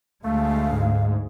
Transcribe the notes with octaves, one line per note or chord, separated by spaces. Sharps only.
D2 G#3 A3 F5
G#2